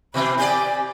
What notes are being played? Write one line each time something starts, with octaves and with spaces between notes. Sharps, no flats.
B2 E3 C4 B5
C4 G4 D5 G#5